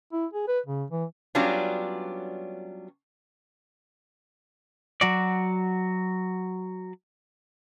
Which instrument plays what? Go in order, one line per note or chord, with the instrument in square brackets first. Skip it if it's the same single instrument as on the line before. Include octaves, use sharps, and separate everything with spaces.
[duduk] E4
G#4
B4
C#3
E3
[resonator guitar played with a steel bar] F#3 G3 B3 C#4 D4 F4
[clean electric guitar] F#3 F#4 D5